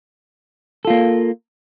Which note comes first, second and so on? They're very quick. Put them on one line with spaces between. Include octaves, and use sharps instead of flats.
A4 F4 A#3